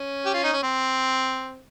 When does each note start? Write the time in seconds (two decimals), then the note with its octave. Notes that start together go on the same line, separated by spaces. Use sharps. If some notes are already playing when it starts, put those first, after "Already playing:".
Already playing: C#4
0.25 G4
0.34 F4
0.44 D#4
0.53 C#4
0.63 C4